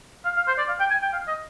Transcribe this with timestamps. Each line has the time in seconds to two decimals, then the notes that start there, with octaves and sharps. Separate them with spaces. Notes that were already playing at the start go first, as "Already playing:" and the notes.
0.25 F5
0.36 F5
0.47 C5
0.58 D5
0.69 F5
0.80 G5
0.91 G#5
1.02 G5
1.13 F5
1.28 D#5